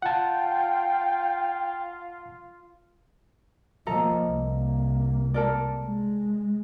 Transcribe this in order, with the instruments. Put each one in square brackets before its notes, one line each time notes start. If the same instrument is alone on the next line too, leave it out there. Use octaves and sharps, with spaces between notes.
[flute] F4 [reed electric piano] F#5 A5 [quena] G5
[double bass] F3 A#3 [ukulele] A4 D#5 A#5
[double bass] C2 A#3
[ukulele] A4 A#4 D5
[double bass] G#3